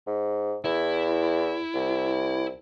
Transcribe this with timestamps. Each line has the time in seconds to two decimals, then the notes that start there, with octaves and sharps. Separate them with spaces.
0.07 G#2
0.64 E2 E4
1.74 C2